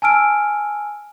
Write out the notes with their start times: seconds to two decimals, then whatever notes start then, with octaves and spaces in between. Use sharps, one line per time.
0.02 G#5 A5 E6 F6 D7